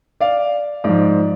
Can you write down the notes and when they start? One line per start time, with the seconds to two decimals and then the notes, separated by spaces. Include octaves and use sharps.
0.20 D5 F5
0.84 G#2 F3 D5